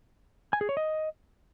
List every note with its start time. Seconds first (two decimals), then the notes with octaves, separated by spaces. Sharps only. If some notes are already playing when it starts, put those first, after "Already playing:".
0.53 G#5
0.61 G#4
0.69 C#5
0.77 D#5